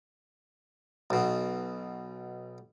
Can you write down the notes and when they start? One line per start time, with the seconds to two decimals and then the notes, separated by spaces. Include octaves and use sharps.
1.10 B1 B2